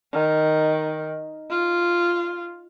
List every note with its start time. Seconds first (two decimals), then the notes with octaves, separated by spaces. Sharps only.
0.13 D#3
1.50 F4